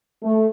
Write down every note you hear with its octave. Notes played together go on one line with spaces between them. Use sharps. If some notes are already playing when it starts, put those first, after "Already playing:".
A3